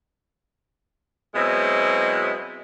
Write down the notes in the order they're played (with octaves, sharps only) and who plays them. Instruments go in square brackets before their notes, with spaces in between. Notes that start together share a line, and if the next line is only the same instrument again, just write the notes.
[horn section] B2 F#3 G#3 C4 E4